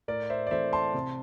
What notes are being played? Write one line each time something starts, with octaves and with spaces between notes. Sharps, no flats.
A2 A#4 D5
C5 E5
D5
E3 A3 C4 C5 E5
A5 C6
C3